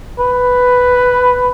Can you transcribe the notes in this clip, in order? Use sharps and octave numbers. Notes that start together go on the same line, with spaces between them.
B4